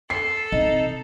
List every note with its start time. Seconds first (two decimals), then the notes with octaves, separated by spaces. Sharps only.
0.10 A4 C7
0.52 C3 D#4